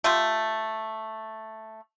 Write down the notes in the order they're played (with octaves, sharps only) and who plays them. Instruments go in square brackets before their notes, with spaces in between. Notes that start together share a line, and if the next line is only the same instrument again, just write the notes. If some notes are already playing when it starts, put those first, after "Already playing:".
[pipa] A3 F4 G4